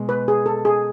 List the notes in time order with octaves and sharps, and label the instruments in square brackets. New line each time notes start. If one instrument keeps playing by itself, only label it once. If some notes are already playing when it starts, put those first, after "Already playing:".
Already playing: [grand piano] B2 G#3
[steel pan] B4
G#4
A4
G#4